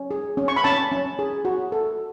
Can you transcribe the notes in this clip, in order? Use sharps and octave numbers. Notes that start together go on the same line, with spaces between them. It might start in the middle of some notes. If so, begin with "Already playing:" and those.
Already playing: C#4
G#4
C#4
C#6
B5
C#4 A5
C#4
G#4
F#4
A4